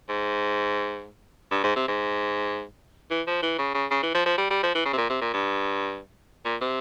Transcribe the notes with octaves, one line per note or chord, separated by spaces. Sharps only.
G#2
G2
G#2
C3
G#2
E3
F3
E3
C#3
C#3
C#3
E3
F3
F3
G3
G3
F3
E3
C#3
C3
A#2
C3
A#2
G2
A#2
C3